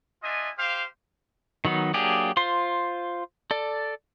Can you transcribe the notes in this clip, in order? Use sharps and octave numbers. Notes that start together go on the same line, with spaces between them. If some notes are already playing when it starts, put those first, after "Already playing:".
D4 F4 D#5 E5 G#5
G4 C5 F5
D#3 F#3 B3 D#4
F#3 A#3 D4 G4 G#4
F4 C5 C6
A4 D5